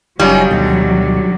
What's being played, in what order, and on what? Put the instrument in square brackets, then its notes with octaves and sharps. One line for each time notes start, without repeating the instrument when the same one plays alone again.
[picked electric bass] F#1 F#2 [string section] F#3 [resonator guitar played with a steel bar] G3 [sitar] C#4 D#4 F4
[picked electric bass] D2 B2 D#3 [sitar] D3